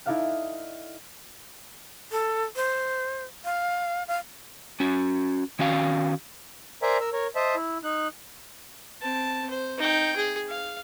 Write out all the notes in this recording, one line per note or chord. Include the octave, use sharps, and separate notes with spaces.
D#4 E4 A4 D5 F5 F#5
A4
C5
F5
F5
C#4 F#4
D#3 C#4 F#4 F5
A#4 C5 D5 E5 G#5 A#5
A#4 E6
A#4 C#5
C5 D#5 E5 A5
E4
D#4 F#6
C4 A5
C5
D#4 G5
G#4
F5